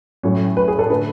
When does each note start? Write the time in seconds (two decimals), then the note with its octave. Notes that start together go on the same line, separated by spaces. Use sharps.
0.23 A2 F#3 C#4
0.57 B4
0.68 G#4
0.79 A4
0.90 D3 A3 B4